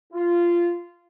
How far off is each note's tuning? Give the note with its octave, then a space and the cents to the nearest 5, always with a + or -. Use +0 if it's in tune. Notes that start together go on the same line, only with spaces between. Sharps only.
F4 -15